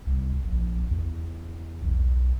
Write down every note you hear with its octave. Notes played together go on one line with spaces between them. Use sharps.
C2
A#1
E2
B1